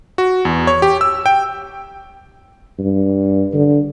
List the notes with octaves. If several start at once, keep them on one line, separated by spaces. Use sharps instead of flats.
F#4
E2
C#5
G4
E6
G5
G2
D3